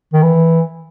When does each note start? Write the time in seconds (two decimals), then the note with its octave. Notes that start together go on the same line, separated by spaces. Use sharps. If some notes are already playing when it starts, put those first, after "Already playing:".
0.13 D#3
0.22 E3